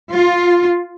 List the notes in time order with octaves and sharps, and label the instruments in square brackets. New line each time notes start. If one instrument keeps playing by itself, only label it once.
[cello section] F4